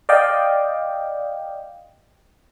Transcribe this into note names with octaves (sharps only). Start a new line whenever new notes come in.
D5 D#5 F5 G5